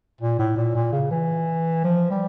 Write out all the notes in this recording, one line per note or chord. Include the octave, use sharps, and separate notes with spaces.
A#2
A2
A#2
A#2
C#3
E3
F3
G3